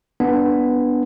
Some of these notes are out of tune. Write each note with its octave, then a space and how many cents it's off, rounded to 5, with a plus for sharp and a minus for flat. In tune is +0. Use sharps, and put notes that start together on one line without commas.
B3 -5 D4 +0